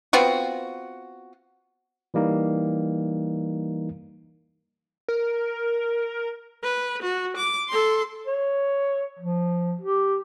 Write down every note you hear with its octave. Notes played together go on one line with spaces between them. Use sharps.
B3 C4 F4 F#4
E3 G3 A#3 D#4
A#4
B4
F#4
D6
A4 C6
C#5
F3
G4